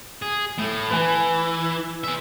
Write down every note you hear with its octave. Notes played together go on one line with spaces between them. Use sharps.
G#4
A2 A3
E3 B4 G#5
G#4 E5